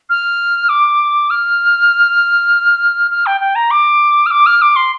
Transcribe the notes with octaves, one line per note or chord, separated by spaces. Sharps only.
F6
D6
F6
F6
G5
G5
A#5
D6
F6
D6
F6
D6
C6